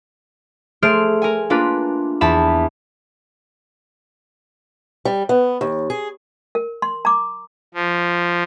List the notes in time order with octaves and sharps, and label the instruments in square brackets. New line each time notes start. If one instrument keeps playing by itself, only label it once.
[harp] A3 G#4 C5 F6 D7
A#4 G#5
A#3 D4 F4 B4
E2 A5 B5 E7
[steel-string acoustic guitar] G3
B3
D#2
G#4
[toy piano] A#4
C6
A#5 D6
[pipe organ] F3